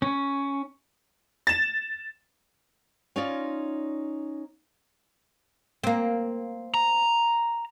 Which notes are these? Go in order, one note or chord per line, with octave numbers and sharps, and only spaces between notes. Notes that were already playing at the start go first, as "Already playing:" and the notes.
C#4
A6 E7
C#4 D#4 F4 C#5 D5
A#3 C4
A#5